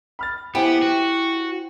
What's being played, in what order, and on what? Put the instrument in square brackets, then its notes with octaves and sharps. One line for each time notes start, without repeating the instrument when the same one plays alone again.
[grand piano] B5 F6 A6
[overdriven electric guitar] B3 [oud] E4 [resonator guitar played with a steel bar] G4 [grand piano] C5 G5 G#5
[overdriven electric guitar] F#4